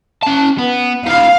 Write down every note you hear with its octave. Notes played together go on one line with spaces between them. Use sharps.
C#4 A5
B3
D#4 F4 F5